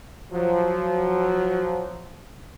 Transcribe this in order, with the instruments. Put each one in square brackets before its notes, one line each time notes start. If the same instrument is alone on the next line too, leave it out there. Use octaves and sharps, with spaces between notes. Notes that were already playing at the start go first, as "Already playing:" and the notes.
[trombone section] F3 F#3